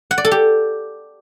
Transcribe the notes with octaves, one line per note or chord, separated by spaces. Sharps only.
F#5
D5
A4
G4